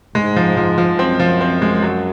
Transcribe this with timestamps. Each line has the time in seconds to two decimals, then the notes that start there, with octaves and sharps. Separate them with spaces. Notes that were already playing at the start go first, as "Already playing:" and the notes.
0.15 G#2 G#3
0.36 F3
0.57 F3
0.78 F3
0.99 F#2 C4
1.19 F3
1.41 C4
1.62 G#3
1.82 F#3